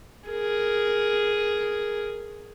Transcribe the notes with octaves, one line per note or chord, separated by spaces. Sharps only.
G#4 A#4